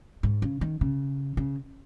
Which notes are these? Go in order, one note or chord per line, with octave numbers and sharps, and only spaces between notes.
G#2
C#3
D#3
C#3
C#3